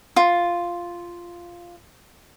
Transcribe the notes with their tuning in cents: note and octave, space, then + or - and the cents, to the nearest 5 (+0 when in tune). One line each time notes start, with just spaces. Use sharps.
F4 -5